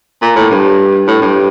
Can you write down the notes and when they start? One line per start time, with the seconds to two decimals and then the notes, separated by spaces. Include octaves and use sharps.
0.22 A#2
0.36 A2
0.50 G2
1.07 A2
1.22 G2